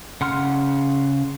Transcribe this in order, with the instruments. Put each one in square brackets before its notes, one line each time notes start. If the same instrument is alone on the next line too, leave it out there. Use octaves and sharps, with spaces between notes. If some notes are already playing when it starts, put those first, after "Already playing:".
[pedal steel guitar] C#3 F#5 C6 F6